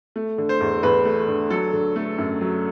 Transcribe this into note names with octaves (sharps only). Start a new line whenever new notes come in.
A3
D3
C5
E2
E2 B4
A3
D3
F#3 A4
D3
A3
F#2
F#3